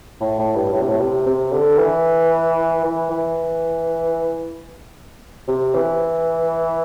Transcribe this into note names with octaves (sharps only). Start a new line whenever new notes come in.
A2
A2
G2
A2
C3
A2
C3
C3
D3
E3
E3
E3
C3
E3